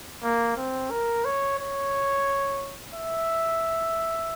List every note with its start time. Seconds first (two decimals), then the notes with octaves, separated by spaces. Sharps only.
0.23 A#3
0.57 C4
0.91 A#4
1.25 C#5
1.59 C#5
2.94 E5